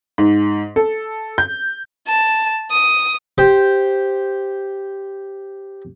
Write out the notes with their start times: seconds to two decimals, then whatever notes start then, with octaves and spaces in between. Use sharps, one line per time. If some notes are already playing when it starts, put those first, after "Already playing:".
0.18 G#2
0.76 A4
1.38 G6
2.07 A5
2.71 D#6
3.38 G4 C5